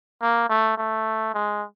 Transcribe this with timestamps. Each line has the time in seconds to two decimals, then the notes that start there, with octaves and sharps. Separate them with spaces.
0.22 A#3
0.49 A3
0.78 A3
1.34 G#3